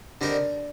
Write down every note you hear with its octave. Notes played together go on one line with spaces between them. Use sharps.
D3 G3 C4 D4 D#4 A#4